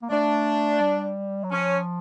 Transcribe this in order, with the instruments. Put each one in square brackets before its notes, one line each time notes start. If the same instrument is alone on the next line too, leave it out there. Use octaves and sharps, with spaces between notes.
[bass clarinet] A#3
[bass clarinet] A3 [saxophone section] D4
[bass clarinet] G3
F#3
[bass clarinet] F3 [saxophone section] C#4